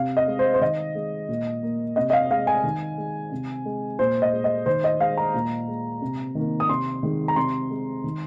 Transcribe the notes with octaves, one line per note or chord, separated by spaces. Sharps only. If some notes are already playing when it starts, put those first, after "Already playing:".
Already playing: C3 F5
D#5
G#3
C5
C5
D#3 D#5
G#3
A#2
A#3
C3 D#5
D#5
F5
G#3 F5
G#5
D#3
G#3
C3
G#3
A#2 C5
D#5
G#3
D#5
D#3 C5
D#5
G#3 F5
A#5
A#2
G#3
C3
D#3 A#3
D#6
C3 C6
D#3 G#3
A#5
C3 C6
G#3
D#3